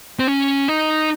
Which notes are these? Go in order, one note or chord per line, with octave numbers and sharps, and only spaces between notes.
C4
C#4
D#4